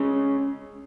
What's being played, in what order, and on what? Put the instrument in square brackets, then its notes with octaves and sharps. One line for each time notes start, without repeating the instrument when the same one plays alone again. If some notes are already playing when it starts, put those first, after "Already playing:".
Already playing: [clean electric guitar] C#3 G#3 C#4